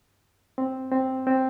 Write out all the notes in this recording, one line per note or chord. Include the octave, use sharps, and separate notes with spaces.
C4
C4
C4